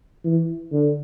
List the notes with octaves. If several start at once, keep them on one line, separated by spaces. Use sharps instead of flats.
E3
D3